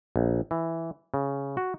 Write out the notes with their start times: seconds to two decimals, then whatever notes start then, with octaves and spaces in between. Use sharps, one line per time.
0.16 A#1
0.51 E3
1.14 C#3
1.57 F#4